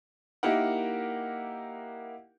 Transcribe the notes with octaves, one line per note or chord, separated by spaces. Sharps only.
A#3 D#4 E4 G4 A#4 F#5